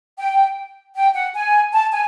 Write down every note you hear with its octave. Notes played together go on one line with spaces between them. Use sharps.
G5
G5
F#5
G#5
A5
G#5